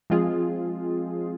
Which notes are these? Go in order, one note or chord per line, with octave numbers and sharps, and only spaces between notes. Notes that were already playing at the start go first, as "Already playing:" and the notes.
F3 G#3 C4 F4 G#4